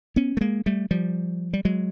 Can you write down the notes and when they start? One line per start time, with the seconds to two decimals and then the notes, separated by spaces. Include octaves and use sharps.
0.16 B3 C#4
0.37 A3
0.41 G#3 A#3
0.66 G3 A3
0.91 F3 G3
1.53 G3
1.65 F#3 G#3